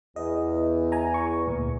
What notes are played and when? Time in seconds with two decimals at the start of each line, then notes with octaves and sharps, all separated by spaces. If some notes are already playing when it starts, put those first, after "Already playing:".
0.16 E2 D#5
0.92 G#5 A#5
1.14 C#6
1.48 D2 A#2